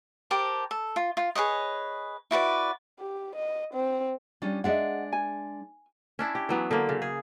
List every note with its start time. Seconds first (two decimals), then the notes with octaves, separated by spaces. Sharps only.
0.31 G4 A#4 C5 A5
0.71 A4
0.96 F4
1.17 F4
1.35 G#4 B4 C#5 D#5
2.31 E4 F#4 B4 D5
3.00 G4
3.35 D#5
3.74 C4
4.42 G3 C#4 D4 F4
4.64 G#3 D4 D#5 E5 F#5
5.13 G#5
6.19 C#4 D4 E4
6.35 G4
6.49 E3 F#3 B3
6.71 D3 A#3
6.89 C#3
7.02 G#4